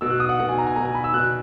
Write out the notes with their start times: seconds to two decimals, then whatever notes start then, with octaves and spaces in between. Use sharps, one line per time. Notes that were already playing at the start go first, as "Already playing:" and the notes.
0.01 B2 E6
0.10 F#6
0.20 D#6
0.29 F#5
0.40 B2 F#5
0.49 G#5
0.58 A#5
0.67 G#5
0.76 B2 A#5
0.85 G#5
0.95 B5
1.04 E6
1.14 B2 F#6